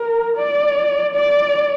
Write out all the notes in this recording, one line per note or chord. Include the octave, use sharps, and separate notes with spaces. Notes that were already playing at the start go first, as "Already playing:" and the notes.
Already playing: A#4
D5
D5